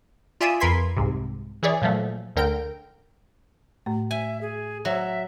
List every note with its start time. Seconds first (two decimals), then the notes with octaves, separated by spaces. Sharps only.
0.41 F4 D5 E5 G#5 D#6 E6
0.60 F2 A#4 B4 C6 G#6 B6
0.97 C2 G#2 C3
1.63 E3 E4 G#4 C#5 D5
1.82 A#2 F3 F#3 A3
2.36 D2 D3 A#4 G5 D7
3.86 A2 A3
4.11 E5 G#5
4.41 G#4
4.85 F#3 E5